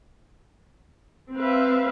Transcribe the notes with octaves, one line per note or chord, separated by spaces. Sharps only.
C4 B4 E5 F5